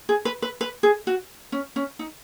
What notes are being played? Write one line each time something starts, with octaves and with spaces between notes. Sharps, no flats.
G#4
B4
B4
B4
G#4
F#4
C#4
C#4
D#4